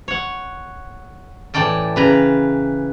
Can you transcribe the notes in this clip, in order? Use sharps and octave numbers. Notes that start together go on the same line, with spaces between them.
C#5 F#5
A2 E3 D5 G5 A5
C#3 B4 A#5